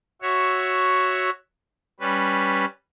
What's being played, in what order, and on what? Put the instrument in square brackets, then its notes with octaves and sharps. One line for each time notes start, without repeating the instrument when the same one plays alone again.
[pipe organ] F#4 C#5 E5
G3 C#4 B4